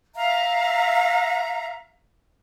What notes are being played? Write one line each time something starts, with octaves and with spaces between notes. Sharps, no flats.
E5 F5 A#5